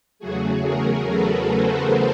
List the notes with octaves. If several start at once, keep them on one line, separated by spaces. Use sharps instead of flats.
E2 C#3 F#3 A3 F#4 G#4
G#4 A#4
A4 B4
A#4 C5